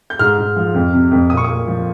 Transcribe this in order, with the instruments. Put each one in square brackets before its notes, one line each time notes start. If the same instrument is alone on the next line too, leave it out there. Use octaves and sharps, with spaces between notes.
[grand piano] G6
G#2 F6
G#2
F3
F2
C3
F2
A#2 D#6
C#6
A#2 D#6
F3